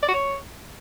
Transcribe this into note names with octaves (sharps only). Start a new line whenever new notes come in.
D5
F#4
C#5